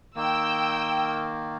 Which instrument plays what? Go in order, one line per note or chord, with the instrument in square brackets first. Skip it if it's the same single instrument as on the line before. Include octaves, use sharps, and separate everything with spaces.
[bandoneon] D#3 A#3 [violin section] G5 E6